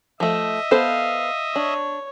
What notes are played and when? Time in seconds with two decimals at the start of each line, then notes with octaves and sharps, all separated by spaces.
0.20 F3 A3 D#5 E5
0.71 B3 A4 C5 F5
1.56 D4 C#5